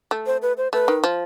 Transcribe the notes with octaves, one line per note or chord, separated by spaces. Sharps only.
A3
C5
B4
C5
A3 B4
D#3
F3